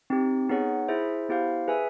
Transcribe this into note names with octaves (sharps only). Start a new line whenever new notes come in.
C4 D#4 G4
B3 D#4 G#4 C#5 F#5
E4 G#4 C5 E5
B3 E4 G4 C5 F5
G#4 B4 E5 G#5